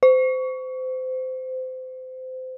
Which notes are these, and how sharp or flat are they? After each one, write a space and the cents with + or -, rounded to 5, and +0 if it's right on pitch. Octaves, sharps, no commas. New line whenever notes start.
C5 -25